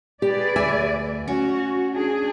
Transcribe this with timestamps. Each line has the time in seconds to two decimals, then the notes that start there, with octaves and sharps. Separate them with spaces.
0.22 G4 G#4 B4 D5
0.56 D2 E5 G#5
1.28 C#4 F#4
1.93 D4 G#4